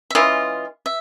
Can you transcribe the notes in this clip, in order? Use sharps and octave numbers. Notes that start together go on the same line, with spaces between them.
E5
E3 G#3 C#4 F4 D#5
E5